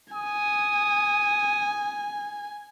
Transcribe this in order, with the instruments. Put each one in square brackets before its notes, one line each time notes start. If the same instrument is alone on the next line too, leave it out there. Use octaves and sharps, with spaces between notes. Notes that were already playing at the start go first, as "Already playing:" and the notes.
[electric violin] G#5 [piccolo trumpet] D#6